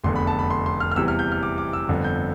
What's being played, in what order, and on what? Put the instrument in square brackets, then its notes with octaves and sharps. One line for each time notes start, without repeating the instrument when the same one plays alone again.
[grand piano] F1 E2 D3 C6
B5
A5
B5
C6
C6
F6
F6
E2 C3 E3 G3 E6
F6
G6
F6
D6
D6
E6
G1 F2 D3
G6